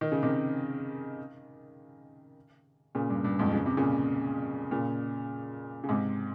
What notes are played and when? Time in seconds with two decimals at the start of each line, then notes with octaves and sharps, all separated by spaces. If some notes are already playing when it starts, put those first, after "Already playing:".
0.01 D#3
0.12 C#3
0.23 C3 D#3
2.95 A#2 C#3
3.10 G2
3.24 G2
3.39 F2 G#2
3.53 C#3
3.66 C3
3.77 A#2 C#3
4.71 A#2 C#3
5.84 C#3
5.89 G#2 C3